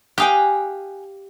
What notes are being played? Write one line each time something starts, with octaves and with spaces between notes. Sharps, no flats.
G4 F5 G5 G#5 D#6 F#6